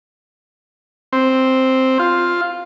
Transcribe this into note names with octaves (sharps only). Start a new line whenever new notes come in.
C4
F4